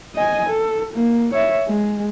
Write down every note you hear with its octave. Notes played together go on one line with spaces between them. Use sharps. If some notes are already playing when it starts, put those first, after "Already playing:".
D#5 G#5
A4
A#3
C#5 E5
G#3